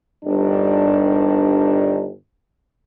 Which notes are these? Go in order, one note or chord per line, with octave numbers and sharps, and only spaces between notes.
G1 G2 D#3 D4